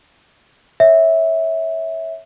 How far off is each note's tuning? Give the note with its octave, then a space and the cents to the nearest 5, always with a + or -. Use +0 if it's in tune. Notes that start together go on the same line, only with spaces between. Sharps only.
C#5 +0 E5 -15